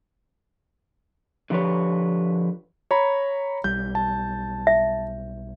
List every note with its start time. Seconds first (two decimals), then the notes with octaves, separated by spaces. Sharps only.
1.50 D3 F3 G4 B4 C#5
2.91 C#5 A#5 B5
3.64 B1 G3 G6
3.95 A5
4.67 E5